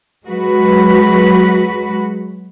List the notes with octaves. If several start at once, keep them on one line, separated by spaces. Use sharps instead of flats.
F#3 G#3 F#4 B4